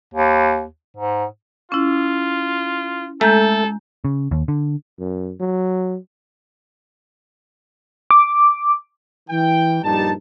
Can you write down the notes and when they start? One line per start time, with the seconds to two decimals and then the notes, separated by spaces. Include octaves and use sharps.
0.14 D#2
0.97 G#2
1.72 C#4 E4 F4
3.21 G#3 A3 A4 A#5 G6
4.05 C#3
4.31 D#2
4.48 D3
4.99 F#2
5.40 F#3
8.11 D6
9.30 E3 G5
9.83 A#1 G2 G3 D#4 A5